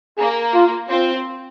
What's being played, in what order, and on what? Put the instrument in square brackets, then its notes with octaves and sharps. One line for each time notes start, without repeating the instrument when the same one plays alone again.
[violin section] A#3 [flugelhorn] G#4
[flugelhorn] F4
[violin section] C4 [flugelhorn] F4